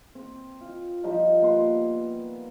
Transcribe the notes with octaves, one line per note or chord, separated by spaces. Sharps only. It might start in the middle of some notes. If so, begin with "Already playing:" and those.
C4
F4
F3 G3 D#4 G4
A#3 B3 C6